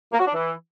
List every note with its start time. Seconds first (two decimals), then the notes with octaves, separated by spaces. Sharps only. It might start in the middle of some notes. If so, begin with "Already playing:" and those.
0.13 A#3
0.20 F#4
0.27 D4
0.34 E3